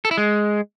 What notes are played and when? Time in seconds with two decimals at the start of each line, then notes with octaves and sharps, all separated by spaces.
0.05 A4
0.11 E4
0.17 G#3